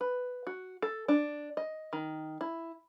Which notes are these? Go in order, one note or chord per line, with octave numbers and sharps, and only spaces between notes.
B4
F#4
A4
D4
D#5
D#3
E4